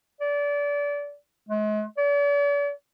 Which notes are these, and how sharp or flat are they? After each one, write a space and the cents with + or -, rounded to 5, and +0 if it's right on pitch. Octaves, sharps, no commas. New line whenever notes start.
D5 -30
G#3 +40
D5 -45